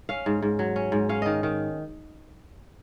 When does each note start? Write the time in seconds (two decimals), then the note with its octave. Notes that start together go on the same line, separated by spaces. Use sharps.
0.09 C#4 F5
0.26 G#2
0.42 G#2
0.59 F#3
0.76 C#4
0.92 G#2
1.09 C#4 F5
1.22 D#3 D#5
1.43 D#3